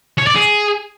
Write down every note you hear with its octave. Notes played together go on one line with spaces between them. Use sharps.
C#5
D5
G#4